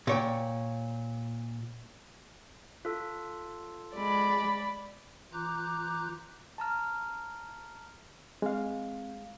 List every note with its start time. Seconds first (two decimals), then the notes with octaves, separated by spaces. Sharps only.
0.07 A#2 C#5 G5
2.85 F4 A4
3.95 G#3 D5 B5
5.33 E3 F4 A#5 D6 F#6 G6
6.58 A5 A#5 F6
8.42 G#3 C4 F5